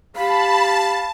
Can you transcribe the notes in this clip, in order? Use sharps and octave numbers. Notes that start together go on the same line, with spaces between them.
G4 F5 A5 B5